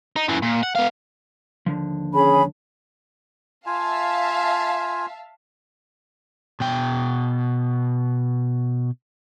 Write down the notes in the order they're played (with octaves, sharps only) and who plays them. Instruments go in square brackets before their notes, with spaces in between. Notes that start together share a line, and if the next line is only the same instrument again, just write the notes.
[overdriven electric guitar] D#4
F#2 E3
A#2
F#5
B3 F5
[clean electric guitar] D#2 D3 F3
[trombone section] C#4 G#4 [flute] B5
[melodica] F4 G#5 [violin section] E5 F5 A5
[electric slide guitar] B2 G5